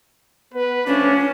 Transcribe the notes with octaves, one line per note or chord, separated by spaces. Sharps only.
B3 B4
F3 A3 C#4 D4